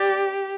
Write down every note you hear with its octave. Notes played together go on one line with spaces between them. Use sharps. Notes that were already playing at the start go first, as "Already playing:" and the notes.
Already playing: G4 D5